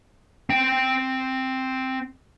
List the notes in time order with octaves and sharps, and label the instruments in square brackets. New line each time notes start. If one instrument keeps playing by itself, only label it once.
[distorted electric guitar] C4 G5